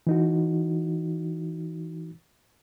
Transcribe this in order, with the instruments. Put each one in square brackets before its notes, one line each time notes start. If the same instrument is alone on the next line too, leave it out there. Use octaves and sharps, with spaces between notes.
[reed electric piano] E3 D#4 F#4